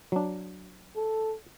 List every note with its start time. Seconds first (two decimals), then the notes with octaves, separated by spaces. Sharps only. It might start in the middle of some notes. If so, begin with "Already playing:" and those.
0.12 F#3 D4
0.96 A4